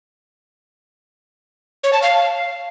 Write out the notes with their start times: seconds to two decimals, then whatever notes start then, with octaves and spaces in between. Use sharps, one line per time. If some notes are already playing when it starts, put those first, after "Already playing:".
1.84 C#5
1.93 A5
2.02 F5